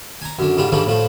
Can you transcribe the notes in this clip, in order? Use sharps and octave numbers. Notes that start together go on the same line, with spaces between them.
G#5 A#5
F#2 D3
G#2 D3 G3 F4
G#2 D3 E3 F3 G3 A3
A2 F3 A3